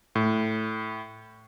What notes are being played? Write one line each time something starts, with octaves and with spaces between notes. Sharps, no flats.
A2